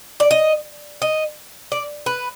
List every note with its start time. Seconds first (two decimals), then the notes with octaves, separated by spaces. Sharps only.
0.20 D5
0.31 D#5
1.02 D#5
1.72 D5
2.06 B4